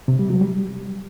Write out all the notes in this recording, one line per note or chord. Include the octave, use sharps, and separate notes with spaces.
C3
G3
F#3
G3